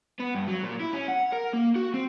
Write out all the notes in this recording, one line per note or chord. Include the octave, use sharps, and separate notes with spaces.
B3
G2
F#3
A#2
E4
C#4
F#5
A#4
A#3
F#4
C4